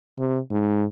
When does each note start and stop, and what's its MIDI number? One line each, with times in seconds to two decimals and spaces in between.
0.18 0.39 48
0.51 0.84 44